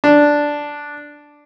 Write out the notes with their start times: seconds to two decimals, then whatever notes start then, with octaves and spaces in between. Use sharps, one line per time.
0.04 D4